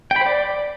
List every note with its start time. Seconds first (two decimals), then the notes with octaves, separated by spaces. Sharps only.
0.11 G5
0.16 B5
0.21 C5
0.26 D5